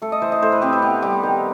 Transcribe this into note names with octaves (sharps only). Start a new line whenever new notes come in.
A3 A4
D#5
E3 C5
D#5
A2 C5
B4
C4 G4
B4
B3 G4
G3 G4
D#3